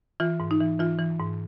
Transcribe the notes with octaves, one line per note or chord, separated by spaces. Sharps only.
E3 F4
G#2
D#4
E3
E3 F4
E3
G#2